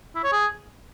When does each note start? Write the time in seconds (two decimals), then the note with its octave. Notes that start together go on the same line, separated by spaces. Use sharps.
0.15 E4
0.24 C#5
0.32 G#4